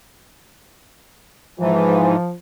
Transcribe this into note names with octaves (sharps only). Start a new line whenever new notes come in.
G#2 E3 F3